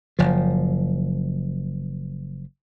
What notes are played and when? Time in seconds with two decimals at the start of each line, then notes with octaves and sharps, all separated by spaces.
0.19 F#1 F3